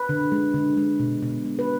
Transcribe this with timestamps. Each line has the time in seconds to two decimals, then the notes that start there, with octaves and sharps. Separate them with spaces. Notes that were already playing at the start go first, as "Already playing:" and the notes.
Already playing: B4
0.09 D3
0.32 G#3
0.54 D3
0.77 G#3
1.00 B2
1.22 B2
1.45 G#3
1.59 B4